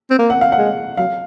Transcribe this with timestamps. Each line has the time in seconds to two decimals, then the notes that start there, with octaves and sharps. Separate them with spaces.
0.10 C4
0.19 A#3
0.30 F#5
0.41 F5
0.52 F#5
0.58 G#3
0.97 F#3 F5